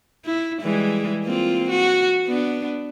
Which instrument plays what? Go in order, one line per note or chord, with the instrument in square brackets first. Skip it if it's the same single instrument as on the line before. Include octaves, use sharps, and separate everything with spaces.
[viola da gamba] E4
E3 G3 G#3
A#3 C4 F4
F#4
B3 D4